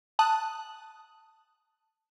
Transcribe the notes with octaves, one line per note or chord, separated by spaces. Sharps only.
A5 D#6 F#6